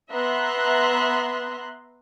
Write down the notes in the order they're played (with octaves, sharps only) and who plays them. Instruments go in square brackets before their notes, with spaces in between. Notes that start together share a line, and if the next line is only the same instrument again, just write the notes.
[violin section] B3 E5 A#5 C6 F#6